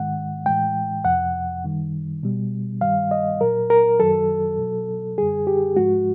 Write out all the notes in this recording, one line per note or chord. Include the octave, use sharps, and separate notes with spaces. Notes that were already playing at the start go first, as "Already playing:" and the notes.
Already playing: G#2 D#3 G#3 F#5
A2 E3 G#3 G5
F2 C3 F3 F#5
F#2 D#3 G3
B2 G3
G2 D#3 G3 F5
D#5
A#2 F#3 A#4
A#4
F#2 D#3 F#3 A4
B2 F#3
F#2 D3 G3 G#4
G4
G#2 F3 G#3 F#4